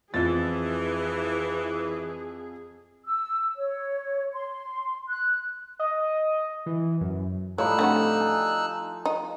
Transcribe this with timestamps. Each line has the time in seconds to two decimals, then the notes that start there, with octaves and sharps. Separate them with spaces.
0.14 F2 E3 G#4 A6
3.05 E6
3.57 C#5
4.33 C6
5.08 F#6
5.79 D#5
6.66 E3
7.01 F#2
7.58 A2 F3 G3 D#4 C#5 E6 F#6
7.79 D3 C4 F#4
8.20 G#5 A5
9.05 D#4